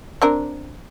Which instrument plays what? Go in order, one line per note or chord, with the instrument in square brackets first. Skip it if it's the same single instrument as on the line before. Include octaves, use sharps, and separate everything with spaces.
[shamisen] C4 D4 A#4